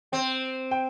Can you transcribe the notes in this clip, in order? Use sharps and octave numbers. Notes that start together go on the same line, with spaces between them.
C4 G5
G5